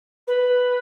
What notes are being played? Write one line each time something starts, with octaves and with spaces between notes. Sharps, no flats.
B4